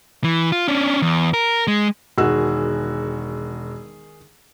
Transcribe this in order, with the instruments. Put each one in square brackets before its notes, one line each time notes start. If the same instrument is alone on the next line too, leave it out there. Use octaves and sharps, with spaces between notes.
[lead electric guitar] E3
F4
C#4 D4
E2
A#4
G#3
[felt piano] E1 F#4 E6 [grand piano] D#3 G#4